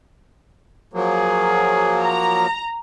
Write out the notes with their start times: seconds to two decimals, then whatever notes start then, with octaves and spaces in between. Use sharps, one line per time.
0.94 F3 F#3 A#3 G#4
2.01 A#5